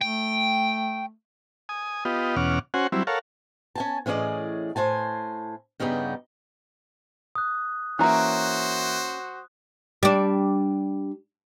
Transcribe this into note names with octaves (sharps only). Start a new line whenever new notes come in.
A3 G5
G#5 D#6
B3 F4 G4 D#5
E2 B2 C#4 F#5 D6 F6
C#4 F#4 C5 F#5 G#5
F#3 G3 C4 E4
A4 A#4 C#5 F5 F#5
C#4 G#5 A5
A2 E3 C#4 G#4 D5 D#5
A2 C5 G#5 A5
G2 C#3 G3 B3 D#4 G4
D#6 F#6
E3 A#3 C#4 E4 F#4 C5 A#5 F#6
G3 D4